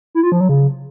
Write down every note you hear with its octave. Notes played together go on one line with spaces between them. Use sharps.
E4
F4
F3
F#3
C#3